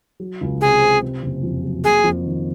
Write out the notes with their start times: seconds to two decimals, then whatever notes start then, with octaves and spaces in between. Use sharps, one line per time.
0.20 F#3
0.41 C#2
0.61 C3 G#4
0.82 C4
1.02 C3
1.23 F#1
1.43 F2
1.64 F#3
1.84 A#3 G#4
2.04 F2
2.26 D#3